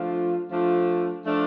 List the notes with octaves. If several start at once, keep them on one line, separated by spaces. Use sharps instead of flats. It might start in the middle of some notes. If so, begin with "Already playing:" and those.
Already playing: F3 A3 D4 F4
F3 A3 D4 F4
F3 A3 D4 F4